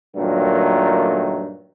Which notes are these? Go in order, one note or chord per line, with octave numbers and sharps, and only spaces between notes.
G2 A#2 D#3 F#3 A3